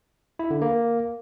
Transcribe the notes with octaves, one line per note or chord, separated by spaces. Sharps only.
E4
D3
A#3